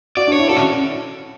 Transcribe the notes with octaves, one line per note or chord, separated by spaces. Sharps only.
F#4 D5
D4
C#5
E4
F#4 A4
C#4